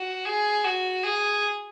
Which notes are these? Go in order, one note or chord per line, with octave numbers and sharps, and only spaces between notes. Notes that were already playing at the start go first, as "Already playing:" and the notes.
Already playing: F#4
G#4
F#4
G#4